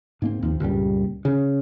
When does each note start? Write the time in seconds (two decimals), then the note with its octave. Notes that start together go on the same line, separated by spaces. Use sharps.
0.22 G#2 A#3 C4
0.42 D#2 F3
0.60 C#2 G2 A#2 G3
1.25 C#3